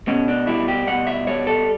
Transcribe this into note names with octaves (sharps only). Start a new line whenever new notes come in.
B2 C#4
D4
G3 E4
G4
B2 F#5
E5
G3 C#5
A4